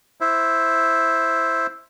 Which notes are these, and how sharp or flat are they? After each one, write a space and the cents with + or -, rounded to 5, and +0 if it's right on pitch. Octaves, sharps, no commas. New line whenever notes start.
E4 +0 C5 +0